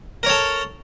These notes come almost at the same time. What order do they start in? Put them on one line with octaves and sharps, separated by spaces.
A#4 C#5 A4